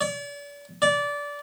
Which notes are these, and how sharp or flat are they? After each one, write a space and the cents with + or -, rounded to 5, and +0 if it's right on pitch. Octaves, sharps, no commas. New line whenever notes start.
D5 -40
D5 -20